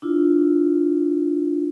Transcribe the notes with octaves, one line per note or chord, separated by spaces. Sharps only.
D4 E4 F4